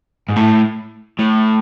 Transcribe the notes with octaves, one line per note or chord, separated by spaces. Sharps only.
G#2
A2
A2